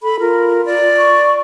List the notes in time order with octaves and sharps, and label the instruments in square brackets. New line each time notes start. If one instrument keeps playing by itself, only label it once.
[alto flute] A4 [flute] B5
[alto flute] F4 [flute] A#4
[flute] D5
[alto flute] C#6